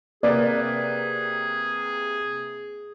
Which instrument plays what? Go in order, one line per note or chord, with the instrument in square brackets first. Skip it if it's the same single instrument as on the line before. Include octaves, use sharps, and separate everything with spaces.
[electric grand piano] C3 A#3 B4 [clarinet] G#4 [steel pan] D5